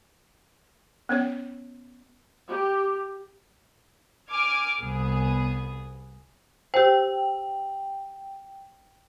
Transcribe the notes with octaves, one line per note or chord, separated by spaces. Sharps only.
B3 C#4 C#5
G4
G#5 D6 F6 G#6
C2 B3 G#4
G4 C5 G5